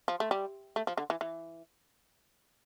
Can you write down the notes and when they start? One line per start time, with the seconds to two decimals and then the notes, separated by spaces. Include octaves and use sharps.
0.08 F3
0.20 A3
0.31 G3
0.76 A3
0.87 F3
0.98 D3
1.10 E3
1.21 E3